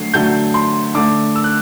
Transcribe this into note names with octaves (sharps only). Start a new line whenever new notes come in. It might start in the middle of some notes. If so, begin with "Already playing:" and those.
Already playing: D3 F#3 A3 C7
D3 F#3 A3 G6
C6
D3 A3 D6
E6
F#6